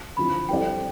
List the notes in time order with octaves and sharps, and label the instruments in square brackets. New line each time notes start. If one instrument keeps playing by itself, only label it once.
[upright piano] D3 F3 C4 E4 [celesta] B5
[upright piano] G3 C4 E4 A4 D5 [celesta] G5